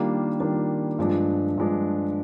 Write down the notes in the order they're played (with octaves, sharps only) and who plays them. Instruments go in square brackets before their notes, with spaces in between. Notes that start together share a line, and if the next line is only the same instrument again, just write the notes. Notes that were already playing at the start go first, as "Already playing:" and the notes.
Already playing: [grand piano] D#3 G3 A#3 D4 F4
D#3 G3 A#3 D4 F4
G2 F3 G#3 D4
G2 F3 G#3 D4